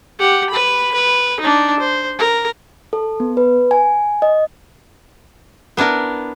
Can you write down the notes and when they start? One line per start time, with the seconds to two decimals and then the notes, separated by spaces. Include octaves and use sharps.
0.19 G4 F#5
0.50 B4 B5
0.94 B4
1.40 D4 D#4
1.79 C5
2.18 A#4
2.93 A4
3.20 B3
3.37 B4
3.71 G#5
4.22 D#5
5.77 B3 D4 E4 A#4